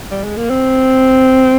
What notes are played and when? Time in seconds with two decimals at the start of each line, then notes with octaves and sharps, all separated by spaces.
0.11 G3
0.24 G#3
0.37 A#3
0.50 C4